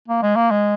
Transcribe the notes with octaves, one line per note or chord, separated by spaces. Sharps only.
A#3
G#3
A#3
G#3